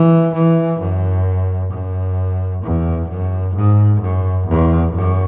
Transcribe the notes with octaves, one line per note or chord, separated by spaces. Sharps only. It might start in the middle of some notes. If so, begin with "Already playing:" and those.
Already playing: E3
E3
F#2
F#2
E2
F#2
G#2
F#2
E2
F#2